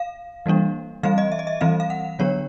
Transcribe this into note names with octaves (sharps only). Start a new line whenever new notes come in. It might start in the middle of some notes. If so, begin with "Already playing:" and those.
Already playing: F5
E3 G3 A#3 D4
E3 G3 C4 F5
D#5
E5
D#5
E5
E3 G3 C4 F5
F5
F#5
D3 F#3 B3 D4 C#5